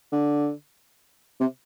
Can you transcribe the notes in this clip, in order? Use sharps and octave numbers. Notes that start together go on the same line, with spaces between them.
D3
C3